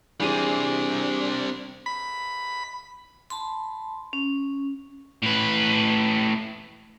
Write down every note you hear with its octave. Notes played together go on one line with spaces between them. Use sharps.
E3 G3 C4 D4 G#4 D#7
B5
A5 B5 C6
C#4
A2 B4